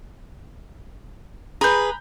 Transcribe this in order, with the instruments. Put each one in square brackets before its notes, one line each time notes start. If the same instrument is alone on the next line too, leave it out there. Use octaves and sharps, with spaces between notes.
[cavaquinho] G#4 B4 [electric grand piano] A#5 B5 G6